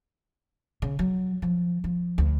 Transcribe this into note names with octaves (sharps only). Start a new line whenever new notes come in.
C#3
F#3
F3
F3
D2